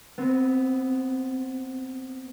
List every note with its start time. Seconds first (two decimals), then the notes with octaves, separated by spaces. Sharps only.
0.18 B3 C4